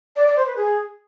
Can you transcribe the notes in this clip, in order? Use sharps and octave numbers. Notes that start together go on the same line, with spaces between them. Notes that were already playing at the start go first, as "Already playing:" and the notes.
D5
D5
C5
B4
G#4